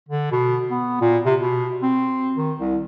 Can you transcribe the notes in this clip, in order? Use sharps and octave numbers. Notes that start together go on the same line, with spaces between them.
D3
B2
B3
A#2
C3
B2
C4
D#3
C2